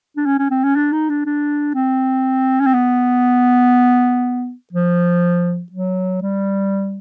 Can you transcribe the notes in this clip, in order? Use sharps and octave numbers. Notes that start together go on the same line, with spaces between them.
D4
C#4
C#4
C4
C#4
D4
D#4
D4
D4
C4
C#4
C4
B3
F3
F#3
G3